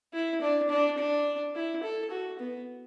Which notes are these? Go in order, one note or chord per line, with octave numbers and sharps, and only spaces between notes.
E4
D4
D4
D4
E4
A4
F#4
B3